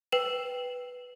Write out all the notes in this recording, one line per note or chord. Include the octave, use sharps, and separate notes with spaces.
B4 G5 E7